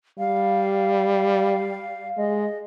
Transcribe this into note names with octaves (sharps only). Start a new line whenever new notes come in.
G3 F5
G#3 D#5